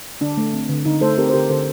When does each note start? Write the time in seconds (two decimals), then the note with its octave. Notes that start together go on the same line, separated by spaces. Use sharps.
0.21 D3 D4
0.37 A3
0.54 C4
0.69 D3
0.85 D3 D#4
1.01 A3 A4 C5
1.18 C4 G4 A#4
1.29 C5
1.34 D3 G4 A#4
1.50 D3 A4 C5